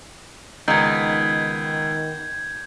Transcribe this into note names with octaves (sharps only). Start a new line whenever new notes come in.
C#2 D#3 B3 D#4 G6 G#6